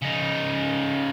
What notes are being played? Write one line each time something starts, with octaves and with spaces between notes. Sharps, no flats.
C#3 D#4